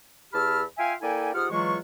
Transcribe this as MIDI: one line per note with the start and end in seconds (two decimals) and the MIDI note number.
0.33 0.63 40
0.33 0.63 67
0.33 0.63 81
0.33 0.63 83
0.33 0.63 88
0.33 0.63 89
0.78 0.94 65
0.78 0.94 76
0.78 0.94 77
0.78 0.94 79
0.78 0.94 80
1.02 1.32 58
1.02 1.32 64
1.02 1.32 69
1.02 1.32 74
1.02 1.32 79
1.02 1.32 80
1.34 1.47 44
1.34 1.47 65
1.34 1.47 67
1.34 1.47 78
1.34 1.47 87
1.34 1.47 89
1.51 1.78 40
1.51 1.78 52
1.51 1.78 54
1.51 1.78 56
1.51 1.78 65
1.51 1.78 85